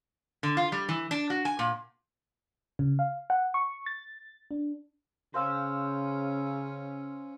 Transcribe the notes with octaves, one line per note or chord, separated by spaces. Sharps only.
D3
F4
G3
E3
D4
F#4
G#5
A#2
C#3
F5
F#5
C#6
A6
D4
C#3 C#4 C5 F5 E6